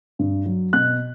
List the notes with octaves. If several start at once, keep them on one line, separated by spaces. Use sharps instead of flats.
G2
F#3
B2 F#6